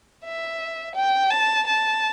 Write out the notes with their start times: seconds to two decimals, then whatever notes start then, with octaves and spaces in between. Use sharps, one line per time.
0.25 E5
0.96 G5
1.31 A5
1.67 A5